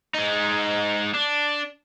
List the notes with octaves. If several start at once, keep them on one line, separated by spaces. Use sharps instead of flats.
G#3 D#4
D4